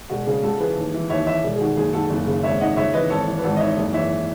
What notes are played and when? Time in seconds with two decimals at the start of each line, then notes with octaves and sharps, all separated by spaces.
0.10 E1 F#4
0.26 C#3 G#4
0.43 C#2 F#4 A4
0.60 E3 G#4 B4
0.77 D#2
0.94 E3
1.10 D#2 C#5 E5
1.26 E3 C#5 E5
1.43 E1
1.56 G#4
1.60 D#3 F#4
1.76 F#1 G#4
1.93 D#3 F#4 A4
2.10 F#1
2.27 C#3
2.43 G#1 C#5 E5
2.60 D#3 D#5 F#5
2.76 C#2 C#5 E5
2.93 E3 B4 D#5
3.10 G#1 A4 C#5
3.28 E3
3.38 B4
3.44 G#1 F#4 A4
3.56 D#5
3.60 D#3 C#5 E5
3.76 F#1
3.93 E3 C#5 E5